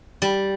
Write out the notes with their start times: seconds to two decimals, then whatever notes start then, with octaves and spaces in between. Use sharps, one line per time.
0.22 G3